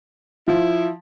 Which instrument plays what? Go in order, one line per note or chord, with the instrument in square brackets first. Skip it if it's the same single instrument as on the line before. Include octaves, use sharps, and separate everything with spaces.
[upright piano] F3 [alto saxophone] E4